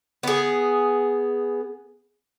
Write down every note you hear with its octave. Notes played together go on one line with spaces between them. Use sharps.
B3 G#4